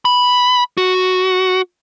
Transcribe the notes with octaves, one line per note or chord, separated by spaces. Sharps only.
B5
F#4